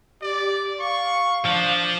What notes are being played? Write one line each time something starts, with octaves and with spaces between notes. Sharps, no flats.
G4 D5
F5 C#6
F3 D4